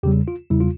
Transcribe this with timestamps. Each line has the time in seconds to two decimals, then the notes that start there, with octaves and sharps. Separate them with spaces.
0.03 E2 C#3 G3 G4
0.28 F4
0.50 E2 C#3 G3 E4
0.61 F4